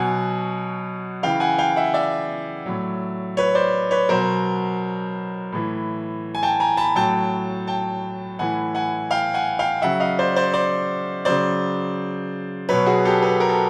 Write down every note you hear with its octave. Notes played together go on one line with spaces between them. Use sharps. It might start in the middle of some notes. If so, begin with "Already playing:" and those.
Already playing: B2 F#3 F#5 G#5
C#3 E3 F5 G5
F#5 G#5
F5 G5
E5 F#5
D5 E5
A2 F#3
B4 C#5
C5 D5
B4 C#5
B2 F#3 A#4 C5
A2 E3
G#5
G5 A5
G#5 A#5
A5 B5
A2 F#3 G5 A5
G5 A5
A2 E3 F#5 G#5
F#5 G#5
F5 G5
F#5 G#5
F5 G5
C#3 F#3 E5 F#5
D#5 F5
C5 D5
C5 D5
C5 D5
C#3 F#3 C5 D5
B2 F#3 B4 C#5
F#4 G#4
G4 A4
A4 B4
A#4
A4